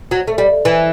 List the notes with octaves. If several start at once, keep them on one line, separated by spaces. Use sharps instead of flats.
F#3
A3
G3
E3